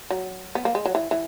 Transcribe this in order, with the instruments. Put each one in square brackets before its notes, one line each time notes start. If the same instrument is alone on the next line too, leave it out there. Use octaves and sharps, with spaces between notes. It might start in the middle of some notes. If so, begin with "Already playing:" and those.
[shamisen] F#3
B3
A#3
G#3
F#3
E3
E3